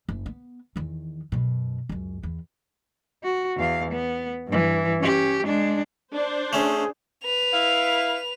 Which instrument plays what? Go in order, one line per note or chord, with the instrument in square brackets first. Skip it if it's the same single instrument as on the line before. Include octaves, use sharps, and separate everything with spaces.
[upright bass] F#1
B3
E2 D#3
F#2 B2
C#2 F#2
E2
[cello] F#4
E2 F5
B3
G2 E3
C#4 G4
G#3 D4
[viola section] D4 C5
[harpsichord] A3 C#4 [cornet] G#4
[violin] B4 F7
[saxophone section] E4 F5